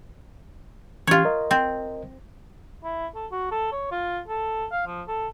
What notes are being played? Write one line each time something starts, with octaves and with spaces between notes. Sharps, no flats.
E3 C#4 F4 G4 C#5
A#4 D#5
C4
E4
A4
F#4
A4
C#5
F4
A4
F5
F3
A4